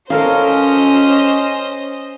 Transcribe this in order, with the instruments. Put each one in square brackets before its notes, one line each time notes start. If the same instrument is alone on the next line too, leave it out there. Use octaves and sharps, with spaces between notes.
[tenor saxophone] C#4 [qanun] A4 A#4 F5 [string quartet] C5 D#5